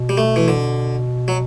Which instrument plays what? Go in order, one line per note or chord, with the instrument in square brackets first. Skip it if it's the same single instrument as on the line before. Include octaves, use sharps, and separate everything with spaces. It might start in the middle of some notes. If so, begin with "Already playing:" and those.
Already playing: [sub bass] B2
[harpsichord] G3
A3
E3
D3
F#3